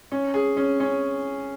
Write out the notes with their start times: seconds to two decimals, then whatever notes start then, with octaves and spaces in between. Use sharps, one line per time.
0.12 C#4
0.34 G#4
0.57 C#4
0.80 C#4